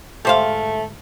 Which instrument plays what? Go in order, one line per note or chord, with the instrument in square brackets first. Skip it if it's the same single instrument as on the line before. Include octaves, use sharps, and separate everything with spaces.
[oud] D2 G#2 E5 [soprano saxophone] A3 [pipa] G4 C5 F5